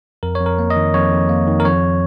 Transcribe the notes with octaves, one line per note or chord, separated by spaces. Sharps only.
F2 A#4
C#5
F2
A#4
A#3
D#5
D#3
F2 C#5
F2
A#3
D#3
A#4
F2 C#5